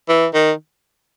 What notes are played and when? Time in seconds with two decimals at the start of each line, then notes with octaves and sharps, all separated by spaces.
0.09 E3
0.34 D#3